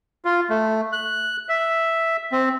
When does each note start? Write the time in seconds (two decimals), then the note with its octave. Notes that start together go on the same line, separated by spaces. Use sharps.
0.25 F4
0.50 A3
0.92 F#6
1.49 E5
2.32 C4